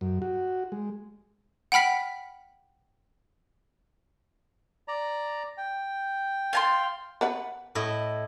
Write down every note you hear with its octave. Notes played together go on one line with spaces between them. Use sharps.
F#2
F#4
G#3
F#5 G5 B5 F6 B6
D5 A#5
G5
F5 A5 C6
B3 B4 F#5
A2 E4 D#5